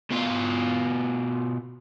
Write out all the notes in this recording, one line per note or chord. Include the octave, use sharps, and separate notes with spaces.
B2 F4